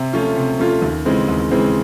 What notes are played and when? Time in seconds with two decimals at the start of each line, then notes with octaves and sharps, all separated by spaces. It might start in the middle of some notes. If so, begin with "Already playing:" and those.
Already playing: C3
0.13 F3 A3 C#4 F4
0.36 C3
0.59 F3 A3 C#4 F4
0.82 D#2
1.05 C#3 E3 G#3 C4
1.28 D#2
1.51 C#3 E3 G#3 C4